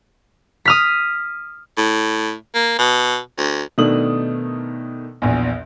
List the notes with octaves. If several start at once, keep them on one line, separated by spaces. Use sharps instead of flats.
D#6 F6 B6
A2
A#3
B2
D2
B2 D#3 A3 D4 D#6 F#7
A#1 E2